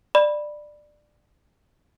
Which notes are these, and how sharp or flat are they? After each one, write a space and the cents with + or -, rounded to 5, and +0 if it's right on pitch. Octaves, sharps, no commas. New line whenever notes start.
D5 +20 B5 -10